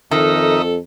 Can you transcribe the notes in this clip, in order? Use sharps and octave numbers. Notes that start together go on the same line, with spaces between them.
F2 D#3 A4 D#5 E5 A#5